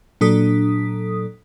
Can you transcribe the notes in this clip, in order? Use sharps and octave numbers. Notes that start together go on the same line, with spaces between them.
A#2 F#3 D4 A4 D#6 B6